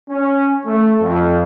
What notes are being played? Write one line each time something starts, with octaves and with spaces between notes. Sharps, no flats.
C#4
A3
F2